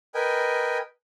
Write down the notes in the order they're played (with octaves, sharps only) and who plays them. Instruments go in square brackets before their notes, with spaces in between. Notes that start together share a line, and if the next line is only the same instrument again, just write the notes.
[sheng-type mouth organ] A#4 B4 D#5 G5 G#5